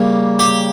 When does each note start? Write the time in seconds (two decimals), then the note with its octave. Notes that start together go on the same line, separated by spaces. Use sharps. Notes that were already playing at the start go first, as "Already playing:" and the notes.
Already playing: C#3 G3 A#3
0.39 G4